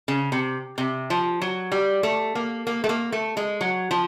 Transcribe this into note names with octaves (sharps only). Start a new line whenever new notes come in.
C#3
C3
C3
F3
F#3
G3
A3
A#3
A#3
A3
A#3
A3
G#3
F#3
F3